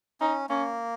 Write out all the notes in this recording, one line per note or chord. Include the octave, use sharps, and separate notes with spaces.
C#4 D#4
A#3 C#4